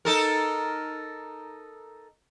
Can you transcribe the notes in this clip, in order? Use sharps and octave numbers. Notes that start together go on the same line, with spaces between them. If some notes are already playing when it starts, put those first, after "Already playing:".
D#4 A4 A#4